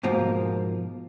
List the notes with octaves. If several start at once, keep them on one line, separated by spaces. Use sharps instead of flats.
G#2 B2 F3 A#3